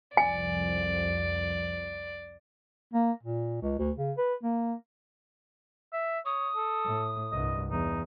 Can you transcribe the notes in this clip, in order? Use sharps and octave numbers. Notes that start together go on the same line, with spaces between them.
C2 F2 F3 D5 G#5
A#3
A#2
C#2
D2
C#3
B4
A#3
E5
C#5 D#6
A4
A2
C2 G2 D#5
E2 D#4